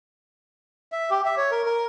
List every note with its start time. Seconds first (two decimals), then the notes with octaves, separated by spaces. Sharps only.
0.92 E5
1.11 G4
1.26 E5
1.37 C#5
1.51 A#4
1.66 A#4